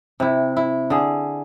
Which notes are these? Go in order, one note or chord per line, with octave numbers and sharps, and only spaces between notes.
C3 E4
E4
D3 G#4